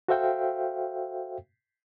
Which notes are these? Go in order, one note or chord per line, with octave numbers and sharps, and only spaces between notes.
F#4 A4 C5 E5 F5 G5